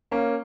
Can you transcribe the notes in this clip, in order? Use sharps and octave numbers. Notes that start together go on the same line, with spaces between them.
A#3 C#4